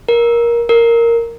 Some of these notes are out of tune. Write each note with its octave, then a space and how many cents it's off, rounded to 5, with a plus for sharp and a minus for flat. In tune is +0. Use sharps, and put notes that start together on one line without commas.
A#4 +15
A#4 -5